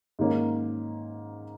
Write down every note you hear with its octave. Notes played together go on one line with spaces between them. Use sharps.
G#2 D#3 A#3 C#4